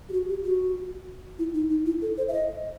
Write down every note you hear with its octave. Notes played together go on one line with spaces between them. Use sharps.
G4
F#4
G4
F#4
E4
D#4
D#4
E4
A4
C5
E5
D#5